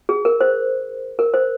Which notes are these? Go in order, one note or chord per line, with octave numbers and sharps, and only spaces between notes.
G#4
A#4
C5
A#4
C5